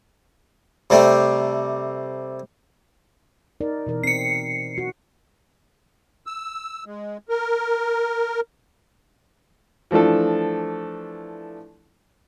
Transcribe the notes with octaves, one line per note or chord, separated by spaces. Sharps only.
C3 G3 A3
D#4 A#4 D5
B2 E3 A#4
C4 C7 C#7
F#4
E6
G#3
A#4
E3 F3 A3 D4 A4